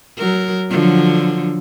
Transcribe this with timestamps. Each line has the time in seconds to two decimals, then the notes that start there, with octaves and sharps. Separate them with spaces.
0.18 F#3 A#4
0.69 D3 F3 F#3